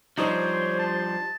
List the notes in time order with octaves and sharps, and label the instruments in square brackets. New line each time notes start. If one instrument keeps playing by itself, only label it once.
[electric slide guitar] F3 G3 D4 [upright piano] D#4 [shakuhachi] C5 [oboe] C#5
[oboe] A5